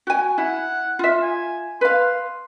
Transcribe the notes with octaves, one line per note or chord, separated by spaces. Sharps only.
F#4 G#5
E4 F#5
F4 E5
G#5
B4 F5 C6